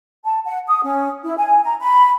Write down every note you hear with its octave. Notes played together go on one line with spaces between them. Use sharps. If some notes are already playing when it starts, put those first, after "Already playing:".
A5
F#5
D#6
C#4
E4
G#5
A#5
B5